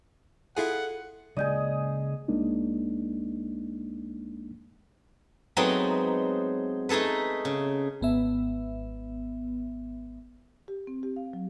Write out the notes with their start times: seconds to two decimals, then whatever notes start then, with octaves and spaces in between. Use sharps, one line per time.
0.57 E4 F4 G#4 A4 F#5
1.37 C#3 G#3 A#3 G#4 D5 D#5 G6
2.28 C2 G#3 A#3 D4 D#4
5.57 F#3 G#3 A3 B3 C4 D#4
6.89 A3 D#4 G#4 A4 B4
7.45 C#3
8.01 G#1 B3 E5
10.68 G4
10.87 C4
11.03 G4
11.16 F5
11.33 F#3